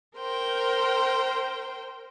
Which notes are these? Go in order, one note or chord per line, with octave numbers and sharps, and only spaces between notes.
A#4 C5 G5